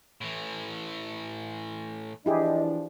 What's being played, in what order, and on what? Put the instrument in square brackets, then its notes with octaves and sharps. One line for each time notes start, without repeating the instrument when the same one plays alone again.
[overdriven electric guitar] A2 E3
[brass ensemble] E3 F3 D4 [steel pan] E4 G4 G#4 [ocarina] D#5